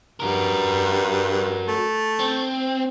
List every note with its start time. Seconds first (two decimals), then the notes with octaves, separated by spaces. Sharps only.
0.20 G2 F#4 A#4
1.67 A3
2.20 C4